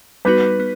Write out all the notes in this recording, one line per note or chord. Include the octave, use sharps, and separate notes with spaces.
G3 B3 D#4 F#4 B4
B3